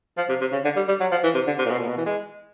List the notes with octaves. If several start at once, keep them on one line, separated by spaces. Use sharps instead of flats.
F3
C3
C3
C#3
D3
G3
G3
F#3
F3
E3
C3
D3
C3
A#2
B2
A#2
B2
E3
G#3